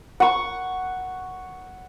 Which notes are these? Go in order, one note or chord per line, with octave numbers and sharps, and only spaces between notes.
F#5 C#6